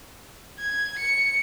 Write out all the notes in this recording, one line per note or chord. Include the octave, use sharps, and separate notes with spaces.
G#6
C#7